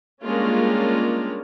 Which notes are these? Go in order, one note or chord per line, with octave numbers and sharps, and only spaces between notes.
G3 G#3 A#3 C#4 D4 F4